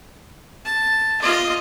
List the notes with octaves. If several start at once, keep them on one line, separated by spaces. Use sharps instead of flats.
A5
F4 D#5